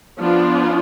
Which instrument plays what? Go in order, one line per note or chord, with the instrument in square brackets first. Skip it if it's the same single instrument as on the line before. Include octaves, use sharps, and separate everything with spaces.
[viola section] F3 B3 D4 F4